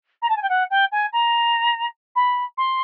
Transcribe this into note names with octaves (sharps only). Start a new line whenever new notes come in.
A#5
A5
G#5
G5
F#5
G5
G#5
A#5
B5
C6